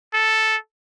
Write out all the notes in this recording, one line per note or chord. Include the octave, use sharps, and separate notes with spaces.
A4